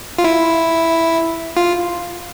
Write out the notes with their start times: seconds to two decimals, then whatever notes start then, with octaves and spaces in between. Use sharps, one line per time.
0.19 F4
0.24 E4
1.57 F4